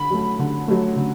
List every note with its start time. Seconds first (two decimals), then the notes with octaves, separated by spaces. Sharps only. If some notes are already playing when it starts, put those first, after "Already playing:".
Already playing: D3 B5
0.10 F#3 A3
0.39 D3
0.68 F#3 A3
0.96 D3